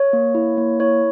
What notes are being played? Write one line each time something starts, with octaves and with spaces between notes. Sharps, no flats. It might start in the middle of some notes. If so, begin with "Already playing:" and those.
Already playing: C#5
A#3
E4
A#3
E4 C#5